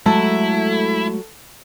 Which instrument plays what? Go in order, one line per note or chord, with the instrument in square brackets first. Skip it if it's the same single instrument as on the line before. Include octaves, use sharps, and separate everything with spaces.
[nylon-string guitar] F#3 [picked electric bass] G#3 A3 [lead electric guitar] E4 [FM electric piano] A4